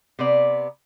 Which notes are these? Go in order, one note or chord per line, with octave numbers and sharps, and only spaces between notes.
C3 B3 D5